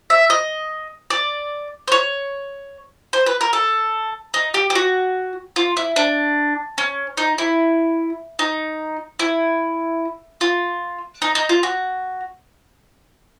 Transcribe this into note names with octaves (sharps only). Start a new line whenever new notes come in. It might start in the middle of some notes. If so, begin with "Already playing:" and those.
E5
D#5
D5
C5
C#5
C5
B4
A#4
A4
D#4
G4
G4
F#4
F4
E4
D4
C#4
D#4
E4
D#4
E4
F4
D#4
D#4
F4
F#4